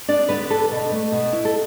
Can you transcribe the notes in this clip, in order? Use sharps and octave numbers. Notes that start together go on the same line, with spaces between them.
B3 D4 D5
D3 B3 B4
D4 A4
B2
A3
B2
E4
A4